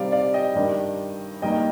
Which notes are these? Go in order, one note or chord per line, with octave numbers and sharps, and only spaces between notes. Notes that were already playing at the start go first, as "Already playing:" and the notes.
Already playing: C3 D#3 G3 C4 D5 F5
D5 F5
D#5 G5
G2 D#3 G3 D4
G2 D#3 A#3 D#4 D#5 G5